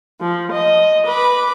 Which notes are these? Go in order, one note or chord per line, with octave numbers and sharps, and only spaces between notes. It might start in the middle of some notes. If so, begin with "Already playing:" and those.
F3
D#5
B4 D6